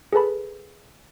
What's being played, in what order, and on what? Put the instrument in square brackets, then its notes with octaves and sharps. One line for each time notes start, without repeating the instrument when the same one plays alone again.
[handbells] G#4 A4 B4 A5 B5